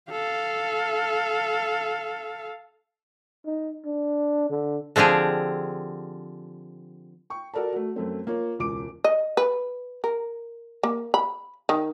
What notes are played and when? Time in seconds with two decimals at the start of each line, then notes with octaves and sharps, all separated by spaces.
0.10 A4 F5
3.46 D#4
3.85 D4
4.50 D3
4.96 D3 F3 C4 G4 G#4
7.30 G5 C#6
7.54 F#4 A4 A#4 D5 A5
7.72 A3 F#4
7.96 F#2 A3 C4
8.27 A#3 F4 C#5
8.59 E1 C#2 D6 D7
9.04 D#5
9.37 B4
10.04 A#4
10.83 A#3
11.14 B5
11.69 D#3